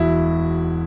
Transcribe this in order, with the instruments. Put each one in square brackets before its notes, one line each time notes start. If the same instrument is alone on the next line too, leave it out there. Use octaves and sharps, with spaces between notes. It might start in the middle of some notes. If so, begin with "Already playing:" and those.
Already playing: [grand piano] E1 E4 F#4